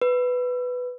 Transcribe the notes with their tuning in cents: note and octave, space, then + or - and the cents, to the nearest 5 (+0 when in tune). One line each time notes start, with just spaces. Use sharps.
B4 +5